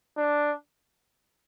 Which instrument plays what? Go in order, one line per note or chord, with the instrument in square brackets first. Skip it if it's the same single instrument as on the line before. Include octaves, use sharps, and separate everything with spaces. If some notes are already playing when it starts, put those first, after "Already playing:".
[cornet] D4